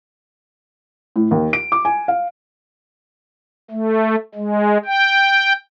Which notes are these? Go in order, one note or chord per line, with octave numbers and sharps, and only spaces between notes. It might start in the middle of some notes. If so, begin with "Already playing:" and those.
A2
D#2
D7
D6
G#5
F5
A3
G#3
G5